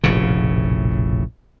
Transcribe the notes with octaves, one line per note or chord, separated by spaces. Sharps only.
F1 A#1 A2 C#3